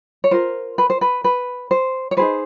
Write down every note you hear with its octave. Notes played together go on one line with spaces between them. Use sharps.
C#5
F4 A#4 C5
B4
C5
B4
B4
C5
C#5
D#4 G#4 B4 C5